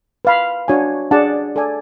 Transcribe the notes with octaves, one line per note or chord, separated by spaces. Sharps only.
B4 F5 B5
D4 F#4 C#5 G#5
D4 G#4 D5 F#5 A5
A4 D5 G#5